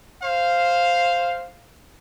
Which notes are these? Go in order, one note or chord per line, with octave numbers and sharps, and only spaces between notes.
C5 F5